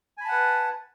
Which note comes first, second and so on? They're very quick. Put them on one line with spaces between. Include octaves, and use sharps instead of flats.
G#5 B5 A5 F#5 B4